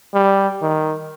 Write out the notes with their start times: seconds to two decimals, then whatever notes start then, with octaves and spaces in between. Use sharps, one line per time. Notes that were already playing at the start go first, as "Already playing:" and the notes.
0.14 G3
0.62 D#3